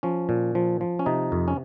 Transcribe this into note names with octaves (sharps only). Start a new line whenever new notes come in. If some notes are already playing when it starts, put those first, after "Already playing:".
F3 C#4
A#2
F3
F3
C#4
C3 D#4
F2
C#4